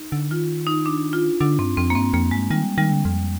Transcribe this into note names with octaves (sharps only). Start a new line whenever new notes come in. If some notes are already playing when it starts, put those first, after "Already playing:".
Already playing: D#4
D3
D#3 F4
D#4
D4
F4
D3 D4
G2 C4
F2 C4
A#3
G2 C4
F2 A#3
G2 G#3
D#3 G3
D#3 G3
D3
F2